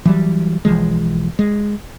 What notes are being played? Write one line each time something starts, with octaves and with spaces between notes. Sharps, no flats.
E3 F#3 G3
B1 E3 F3 G#3
G#3